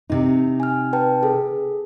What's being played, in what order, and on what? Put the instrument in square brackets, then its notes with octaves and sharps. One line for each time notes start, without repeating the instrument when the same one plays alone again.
[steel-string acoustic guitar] C3 D#4
[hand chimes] G#5 F6
B4 G5 A5
G#4 A4